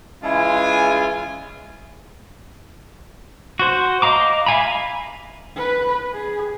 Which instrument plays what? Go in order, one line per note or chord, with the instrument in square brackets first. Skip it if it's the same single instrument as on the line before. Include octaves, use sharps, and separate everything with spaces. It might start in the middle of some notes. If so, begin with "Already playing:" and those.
[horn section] C#3 E3 G#3 E4 F4 G#5
[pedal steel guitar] F#4 C5
D#5 F5 A#5 D6
E5 F5 G#5 A#5 B5
[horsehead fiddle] B4
G#4